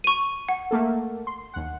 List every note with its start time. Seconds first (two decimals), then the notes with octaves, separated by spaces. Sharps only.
0.04 C#6 D#7
0.49 F#5
0.71 A3 A#3 A4
1.27 C6
1.54 D#2 F#5